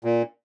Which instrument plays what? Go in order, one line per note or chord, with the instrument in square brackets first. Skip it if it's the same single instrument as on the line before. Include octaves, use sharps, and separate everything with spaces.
[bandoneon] A#2